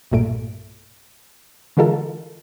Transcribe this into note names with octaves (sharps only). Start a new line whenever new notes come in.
B1 G2 A#2 A3 D7
D3 E3 G#3 F4 A4 A#4